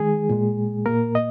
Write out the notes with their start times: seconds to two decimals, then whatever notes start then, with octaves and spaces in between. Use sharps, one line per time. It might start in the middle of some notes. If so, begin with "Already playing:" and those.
Already playing: D#3 G#3 G#4
0.29 A#2 G#3
0.86 A#2 A#3 A#4
1.15 D#5